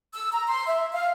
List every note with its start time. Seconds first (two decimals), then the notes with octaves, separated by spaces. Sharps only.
0.12 E6
0.32 A#5
0.48 C6
0.66 E5
0.93 F5